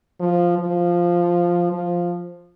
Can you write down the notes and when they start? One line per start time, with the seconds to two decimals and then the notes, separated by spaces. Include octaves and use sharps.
0.20 F3
0.58 F3
1.73 F3